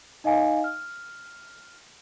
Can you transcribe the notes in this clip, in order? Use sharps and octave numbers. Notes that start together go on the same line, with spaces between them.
D#4 D#5 F5 G#5
F6